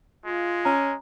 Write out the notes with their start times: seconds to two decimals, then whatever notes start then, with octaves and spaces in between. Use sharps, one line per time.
0.25 G#3 F4
0.65 C#4 A#5